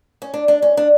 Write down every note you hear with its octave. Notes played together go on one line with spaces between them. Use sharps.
C#4
D4
D4
C#4
D4